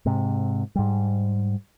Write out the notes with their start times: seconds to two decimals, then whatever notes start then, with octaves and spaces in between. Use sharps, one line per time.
0.06 G#2 C3
0.76 G#2 G3